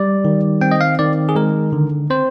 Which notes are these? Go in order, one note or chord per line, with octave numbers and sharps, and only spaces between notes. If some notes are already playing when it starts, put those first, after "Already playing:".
Already playing: G3 D5
D#3
C4 G5
D#5
F5
D#3 D5
G#4
G#3 A#4
D3
C4 C5